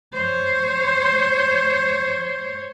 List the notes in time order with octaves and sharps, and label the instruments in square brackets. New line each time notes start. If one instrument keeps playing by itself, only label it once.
[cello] C5 C#5